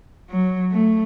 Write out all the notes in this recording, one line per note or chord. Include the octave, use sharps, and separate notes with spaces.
F#3
A3